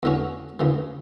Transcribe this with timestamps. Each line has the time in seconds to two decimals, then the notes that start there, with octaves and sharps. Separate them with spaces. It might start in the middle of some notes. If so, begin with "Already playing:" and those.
0.03 E2 D3 A3 C#4 F#4
0.60 D2 C#3 E3